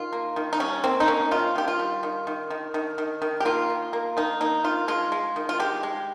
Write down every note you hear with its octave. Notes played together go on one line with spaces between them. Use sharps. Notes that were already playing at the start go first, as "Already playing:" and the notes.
Already playing: D#3 F4
A#3
D#3
D#4
G3 C#4
A#3 C4
D#4
A#3 C#4
D#3 F4
D#3 G4
F4
G3
D#3
D#3
D#3
D#3
D#3
D#3
G4
A#3 F4
D#3
A#3
D#3 D#4
A#3 D#4
D#3 F4
G#3 F4
G#3
D#3
F4
G#3 G4
G#3